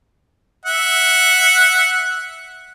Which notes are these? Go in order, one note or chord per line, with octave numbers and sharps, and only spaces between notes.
E5 F#5